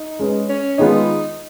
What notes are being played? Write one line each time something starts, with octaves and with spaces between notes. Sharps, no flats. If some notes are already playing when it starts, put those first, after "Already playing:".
Already playing: D#4
G#3 C#4 G#4 B4
C#4
D#3 G#3 B3 D#4 F4 B4